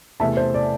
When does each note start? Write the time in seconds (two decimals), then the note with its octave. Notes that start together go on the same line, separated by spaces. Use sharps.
0.20 E2 C3 A3 E5 A5
0.37 C5
0.54 D5